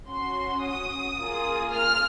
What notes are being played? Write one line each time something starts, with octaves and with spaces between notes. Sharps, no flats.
C#4 F#4 C6
D#6
A#3 F4 G#4
F6